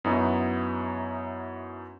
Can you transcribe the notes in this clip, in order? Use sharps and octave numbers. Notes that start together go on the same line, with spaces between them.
F#2 B3 D#4 E4 F#4